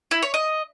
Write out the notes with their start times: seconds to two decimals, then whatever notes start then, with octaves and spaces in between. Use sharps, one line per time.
0.11 E4
0.22 C#5
0.34 D#5